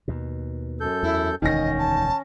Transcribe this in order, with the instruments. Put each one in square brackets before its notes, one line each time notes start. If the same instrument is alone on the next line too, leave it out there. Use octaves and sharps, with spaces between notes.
[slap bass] D#2 B2
[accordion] F#2 A4 G6
[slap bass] E2 [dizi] E4
[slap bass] E1 D2 [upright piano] D#3 A#6 [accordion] C#4 [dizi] D#5
[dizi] A5